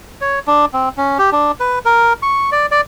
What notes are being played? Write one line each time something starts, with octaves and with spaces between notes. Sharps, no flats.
C#5
D4
C4
C#4
G4
D4
B4
A#4
C#6
D5
D5